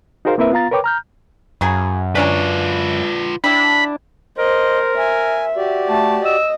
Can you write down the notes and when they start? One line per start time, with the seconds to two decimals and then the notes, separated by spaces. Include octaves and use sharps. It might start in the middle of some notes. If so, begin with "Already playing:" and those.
0.25 D#4 F#4 G#4 A#4 C5 F5
0.38 A#3 C4 E4 A#4 B4 E5
0.52 B3 F4 F5 A#5 A6
0.71 A#4 B4 C#5 G5 D6
0.84 A#5 F6 G6
1.61 F#2 C#3 F#3 G#4
2.15 F#3 C#4 D4 F4 B4
3.44 G3 D4 E4 B5
4.38 A#4 C5 D#5
4.98 E5 G#5
5.56 F#4 G4 D5
5.89 A3 A5
6.25 D#5 E6